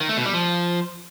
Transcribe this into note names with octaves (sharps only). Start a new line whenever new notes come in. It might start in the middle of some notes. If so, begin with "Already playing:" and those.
D#3
A3
B2
G3
F3